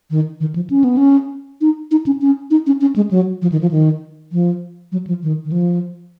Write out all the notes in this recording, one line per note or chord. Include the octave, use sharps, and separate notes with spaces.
D#3
D#3
F3
C#4
B3
C#4
D#4
D#4
C#4
C#4
D#4
C#4
C#4
G#3
F#3
F3
D#3
F3
D#3
F3
F#3
F3
D#3
D#3
F3